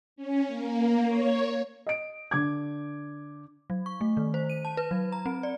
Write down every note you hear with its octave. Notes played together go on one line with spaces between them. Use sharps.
C#4
A#3
C#5
D#5 D7
D3 D6 G#6
F#3
C#6
A3
D#3
C5
D#7
A5
B4
F#3
A#5
C4
D5